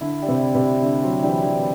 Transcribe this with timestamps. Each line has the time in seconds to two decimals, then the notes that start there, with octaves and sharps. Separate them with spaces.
0.01 D3 E4
0.22 G3
0.28 C3
0.42 E4
0.55 C3
0.62 E4
0.82 D3 G3
1.03 F#3 C4
1.23 E3 G3
1.43 E3 E4